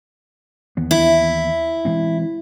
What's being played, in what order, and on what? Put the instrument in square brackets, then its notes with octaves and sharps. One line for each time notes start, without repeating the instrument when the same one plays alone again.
[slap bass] D#2 E3 B3
[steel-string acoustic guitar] E4
[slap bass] E3 G#3 C4